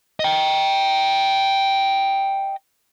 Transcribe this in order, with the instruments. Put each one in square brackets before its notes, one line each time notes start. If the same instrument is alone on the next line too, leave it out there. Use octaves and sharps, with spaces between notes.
[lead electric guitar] D#5 G5